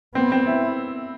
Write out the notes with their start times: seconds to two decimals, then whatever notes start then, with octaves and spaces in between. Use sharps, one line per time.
0.15 B3 C4
0.32 C4
0.47 E4